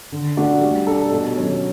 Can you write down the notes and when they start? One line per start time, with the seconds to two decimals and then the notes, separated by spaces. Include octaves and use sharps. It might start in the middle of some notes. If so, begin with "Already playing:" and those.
0.12 D3
0.37 A3 D4 F#4
0.61 G3
0.87 D4 A4
1.11 B2
1.36 F#3 C#4